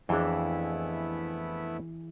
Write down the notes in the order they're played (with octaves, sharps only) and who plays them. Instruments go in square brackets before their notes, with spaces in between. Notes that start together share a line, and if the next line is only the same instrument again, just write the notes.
[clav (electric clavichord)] F2 C4 D4 [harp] E3 G#4 [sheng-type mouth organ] A3 B3 E4